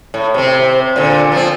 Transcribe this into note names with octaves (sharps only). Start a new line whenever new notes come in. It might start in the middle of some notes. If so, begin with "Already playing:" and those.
A2
C3 C4
A#2 D3
F3 C4